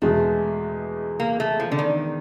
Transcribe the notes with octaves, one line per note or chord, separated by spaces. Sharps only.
E2 B2 G#3 A3
A#3
A3
F3
D3
D#3